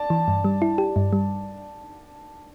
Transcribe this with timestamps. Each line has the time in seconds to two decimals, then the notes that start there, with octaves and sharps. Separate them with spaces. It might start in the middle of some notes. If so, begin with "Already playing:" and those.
Already playing: D5 A5
0.10 E3
0.28 G2
0.45 G3
0.62 E4
0.78 G4
0.96 G2
1.13 G3